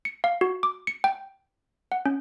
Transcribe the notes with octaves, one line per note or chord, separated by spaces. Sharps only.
C#7
F5
F#4
D6
C#7
G5
F#5
C#4